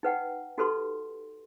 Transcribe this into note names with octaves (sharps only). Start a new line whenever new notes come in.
D#4 B4 F#5 G5
D#4 F#4 G4 A4 B4 C6